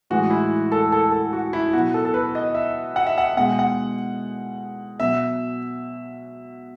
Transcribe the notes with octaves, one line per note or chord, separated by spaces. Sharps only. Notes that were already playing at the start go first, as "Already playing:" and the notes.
A2 E3 G#3 F#4
E4
A4
A4
A4
F#4
E4
B2 F#3 F#4
A4
A4
B4
D#5
E5
F#5
E5
F#5
B2 G#3 F#5
F#5
B2 F#3 E5